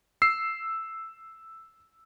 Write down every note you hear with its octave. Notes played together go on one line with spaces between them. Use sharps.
E6 C7